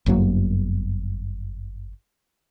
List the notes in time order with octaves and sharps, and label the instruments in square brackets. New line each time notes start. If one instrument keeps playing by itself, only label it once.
[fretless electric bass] G1 F#2 F#3 A#3